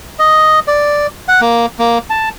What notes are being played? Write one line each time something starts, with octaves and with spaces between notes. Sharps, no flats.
D#5
D5
F#5
A#3
A#3
A5